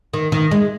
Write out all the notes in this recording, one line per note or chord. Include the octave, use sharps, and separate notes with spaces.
D#3
D#3
G#3